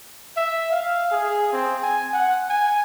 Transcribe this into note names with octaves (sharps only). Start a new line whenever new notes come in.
E5
F5
G#4
C4
G#5
F#5
G#5